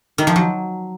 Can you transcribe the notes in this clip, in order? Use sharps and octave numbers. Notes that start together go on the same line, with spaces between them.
D#3
F3
F#3